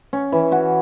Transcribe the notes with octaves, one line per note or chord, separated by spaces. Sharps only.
C#4
E3
F#4